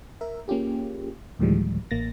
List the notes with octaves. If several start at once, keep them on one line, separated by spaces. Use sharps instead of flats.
A#4 E5
A#3 C#4 F4 G4 G#4
D2 A2 D#3 F3 G3 G#3
A1 A#3 A6 A#6